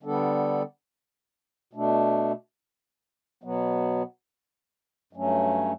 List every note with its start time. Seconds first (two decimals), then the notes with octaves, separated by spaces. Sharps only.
0.03 D3 G3 B3 D4 A4
1.73 B2 A3 D4
3.43 B2 F#3 B3
5.13 G2 F#3 A3 C#4